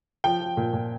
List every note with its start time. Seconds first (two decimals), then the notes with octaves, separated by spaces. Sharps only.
0.24 F3 G5
0.41 F3
0.57 A#2
0.73 A#2